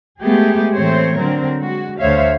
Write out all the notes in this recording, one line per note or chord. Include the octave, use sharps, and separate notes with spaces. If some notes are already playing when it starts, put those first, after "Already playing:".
G#3 A3 B3 G4 G#4
A2 E3 A3 C4 C5 C#5
D3 F#3 C4 A#4
G#3 F#4
D2 D3 C5 C#5 E5 F5